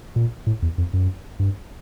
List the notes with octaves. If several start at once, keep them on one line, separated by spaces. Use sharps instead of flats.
A#2
A2
E2
F2
F#2
G2